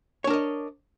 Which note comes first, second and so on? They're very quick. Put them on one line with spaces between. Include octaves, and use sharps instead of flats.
C#5 D4 A#4 D#5